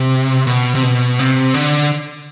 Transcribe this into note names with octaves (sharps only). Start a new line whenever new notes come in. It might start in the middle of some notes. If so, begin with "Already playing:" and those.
Already playing: C3
B2
C3
B2
C3
D3